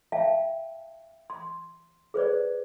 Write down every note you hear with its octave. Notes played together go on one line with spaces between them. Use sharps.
E5 F5 G5 A5
C6
G#4 B4 C5 D5